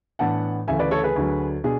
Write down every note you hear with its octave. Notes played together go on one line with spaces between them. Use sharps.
A2 E3 B3 D4 F#5 A5
D2 C#3 E3 A3 E5 G#5
B4 D5
A4 C#5
G#4 B4
D2 D3 F#3
B2 D4 G#4